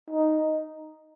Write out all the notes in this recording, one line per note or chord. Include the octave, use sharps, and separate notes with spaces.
D#4